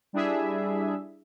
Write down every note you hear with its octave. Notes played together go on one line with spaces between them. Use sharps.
G3 D4 E4 G#4 E5